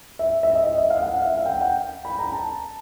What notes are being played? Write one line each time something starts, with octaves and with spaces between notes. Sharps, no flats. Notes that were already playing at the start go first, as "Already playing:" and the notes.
E5
E5
D#5
D#5
E5
F5
F#5
F5
E5
F5
G5
F#5
G5
B5
A#5
A5